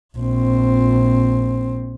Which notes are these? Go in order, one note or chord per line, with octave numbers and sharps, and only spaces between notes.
A#1 C4